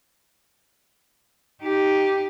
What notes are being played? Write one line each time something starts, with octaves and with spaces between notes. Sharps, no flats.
D#4 G4